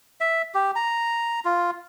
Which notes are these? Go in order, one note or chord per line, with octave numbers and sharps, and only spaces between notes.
E5
G4
A#5
F4